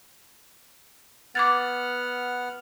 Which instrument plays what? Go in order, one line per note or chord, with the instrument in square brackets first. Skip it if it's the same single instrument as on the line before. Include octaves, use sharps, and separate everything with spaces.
[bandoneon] B3 F#5 F6 [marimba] D6 G#6 A6